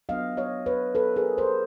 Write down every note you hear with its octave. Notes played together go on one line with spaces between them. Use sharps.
F#3 B3 D4 D#5 F5
C#5 D#5
B4 C#5
A4 B4
G#4 A#4
A#4 C5